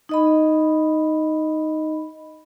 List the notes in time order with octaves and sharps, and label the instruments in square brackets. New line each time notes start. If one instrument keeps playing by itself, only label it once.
[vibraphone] D#4 D#5 B5